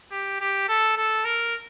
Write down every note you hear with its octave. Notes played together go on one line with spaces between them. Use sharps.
G4
G4
A4
A4
A#4